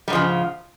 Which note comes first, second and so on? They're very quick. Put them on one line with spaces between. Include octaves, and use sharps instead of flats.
G3 G#2 F3 C#3